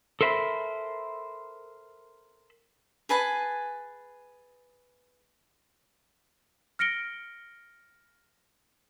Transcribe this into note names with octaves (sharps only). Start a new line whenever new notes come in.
A4 A#4 C5 E5 F#5 B5
G#4 B4 G#5 A5
F6 A#6 C#7 D7 G7